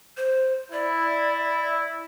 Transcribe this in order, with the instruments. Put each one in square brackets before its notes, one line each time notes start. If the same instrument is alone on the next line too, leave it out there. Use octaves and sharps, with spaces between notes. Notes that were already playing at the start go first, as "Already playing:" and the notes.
[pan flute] C5
[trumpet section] E4 [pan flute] D5